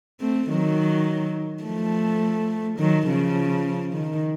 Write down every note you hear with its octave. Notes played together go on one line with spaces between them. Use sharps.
A3 C4
D#3 F#3
F3 A3
D#3 F#3
C#3 F3
D#3